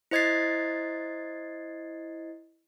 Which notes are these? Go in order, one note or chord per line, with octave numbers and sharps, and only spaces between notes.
E4 C5 D#5 G#6 A6 C7